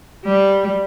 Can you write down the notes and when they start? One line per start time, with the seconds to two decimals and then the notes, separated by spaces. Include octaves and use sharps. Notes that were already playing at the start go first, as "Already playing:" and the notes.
0.25 G3